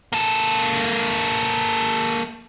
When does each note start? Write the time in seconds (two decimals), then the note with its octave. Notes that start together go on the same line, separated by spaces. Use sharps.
0.13 A#3 A4